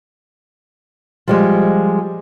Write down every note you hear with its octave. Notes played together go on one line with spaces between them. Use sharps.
F3 G3 G#3